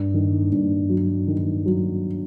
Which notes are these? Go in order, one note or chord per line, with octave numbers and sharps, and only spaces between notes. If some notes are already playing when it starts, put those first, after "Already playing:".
Already playing: G2
D#3
G2
F#3
D#3
F#3